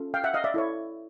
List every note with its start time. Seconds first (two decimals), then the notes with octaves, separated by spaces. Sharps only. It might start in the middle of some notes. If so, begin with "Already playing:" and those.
Already playing: C#4 F4 A4
0.14 F5 G5
0.24 E5 F#5
0.34 D#5 F5
0.44 D5 E5
0.54 E4 A4 C#5